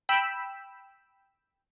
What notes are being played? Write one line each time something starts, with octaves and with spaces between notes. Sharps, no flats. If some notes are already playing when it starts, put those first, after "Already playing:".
G5 B5 E6